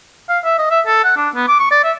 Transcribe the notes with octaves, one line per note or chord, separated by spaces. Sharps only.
F5
E5
D#5
E5
A4
F#5
D4
B3
D6
C#6
D5
E5